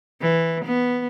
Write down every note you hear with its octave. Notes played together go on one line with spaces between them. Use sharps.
E3
B3